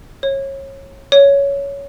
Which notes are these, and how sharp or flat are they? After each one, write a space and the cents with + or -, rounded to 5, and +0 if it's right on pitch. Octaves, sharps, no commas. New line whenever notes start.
C#5 -25
C#5 +15